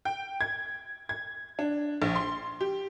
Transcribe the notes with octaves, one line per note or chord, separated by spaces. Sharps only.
G5
G#6
G#6
D4
A#1
C6
G4